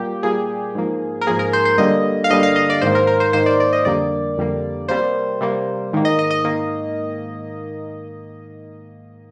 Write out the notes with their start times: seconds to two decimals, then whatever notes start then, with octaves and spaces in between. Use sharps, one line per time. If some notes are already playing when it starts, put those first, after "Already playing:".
Already playing: A#2 G3 A#3 G4
0.23 A#2 G3 A#3 G#4
0.75 G#2 F3 A#3
1.21 A#4
1.27 G#2 F3 A#3 G#4
1.39 A#4
1.53 C5
1.65 C5
1.78 G2 D3 G3 A#3 D#5
2.24 F5
2.30 G2 D3 G3 A#3 D#5
2.43 F5
2.56 D#5
2.70 D5
2.81 G#2 D#3 A#3 C5
2.95 A#4
3.07 A#4
3.20 C5
3.33 G#2 D#3 A#3 C5
3.46 D5
3.60 D5
3.73 D#5
3.85 F2 D3 G3 A#3 D5
4.38 F2 D3 G3 A#3
4.88 C3 G3 A#3 C5
5.41 C3 G3 A#3
5.93 G#2 D#3 A#3
6.05 D#5
6.19 D#5
6.31 D#5
6.45 D#3 A#3